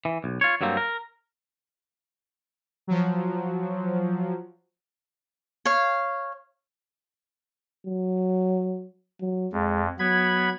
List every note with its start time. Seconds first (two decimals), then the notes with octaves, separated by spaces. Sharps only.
0.05 E3
0.24 B1
0.41 F4 C#5
0.61 G2 F#3 A3 A#3 C4
0.77 A#4
2.87 F3 F#3
5.65 C#5 F5
7.87 F#3
9.21 F#3
9.53 F2 G#3
9.99 F#3 B3 B5 G#6